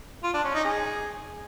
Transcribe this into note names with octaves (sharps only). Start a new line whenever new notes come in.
F4
D4
C#4
D#4
G#4